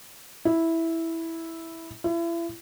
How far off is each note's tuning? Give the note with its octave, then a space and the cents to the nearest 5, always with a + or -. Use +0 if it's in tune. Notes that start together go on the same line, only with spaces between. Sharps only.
E4 -5
E4 +35